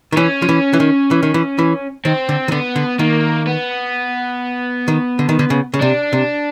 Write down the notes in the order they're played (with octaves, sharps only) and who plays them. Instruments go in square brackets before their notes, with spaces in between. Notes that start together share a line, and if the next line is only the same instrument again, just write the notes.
[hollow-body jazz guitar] D#3
[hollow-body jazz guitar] E3 [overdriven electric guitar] C#4
[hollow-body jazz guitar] F3
E3
E3
D#3
E3
D#3
E3
E3
[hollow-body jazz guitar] D#3 [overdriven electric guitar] C4
[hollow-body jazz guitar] D3
D#3
[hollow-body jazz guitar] D3 [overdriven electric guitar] B3
[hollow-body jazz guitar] D3
[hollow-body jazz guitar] D#3 [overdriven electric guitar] A#3
[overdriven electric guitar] B3
[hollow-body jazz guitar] D#3
D3
D#3
D3
C#3
C#3
[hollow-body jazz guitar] C3 [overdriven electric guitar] D4
[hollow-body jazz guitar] C3